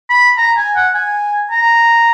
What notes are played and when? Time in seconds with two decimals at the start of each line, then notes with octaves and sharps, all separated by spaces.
0.10 B5
0.38 A#5
0.57 G#5
0.76 F#5
0.95 G#5
1.51 A#5